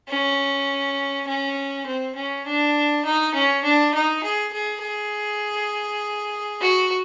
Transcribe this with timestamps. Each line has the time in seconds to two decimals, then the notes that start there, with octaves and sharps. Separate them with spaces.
0.09 C#4
1.27 C#4
1.87 C4
2.16 C#4
2.46 D4
3.05 D#4
3.34 C#4
3.64 D4
3.94 D#4
4.23 G#4
4.53 G#4
4.83 G#4
6.61 F#4